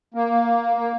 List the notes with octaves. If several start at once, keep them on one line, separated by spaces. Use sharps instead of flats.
A#3
A#3